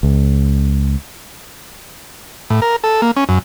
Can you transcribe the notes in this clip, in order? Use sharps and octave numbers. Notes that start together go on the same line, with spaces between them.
C#2
A2
A#4
A4
A#3
C#4
F#2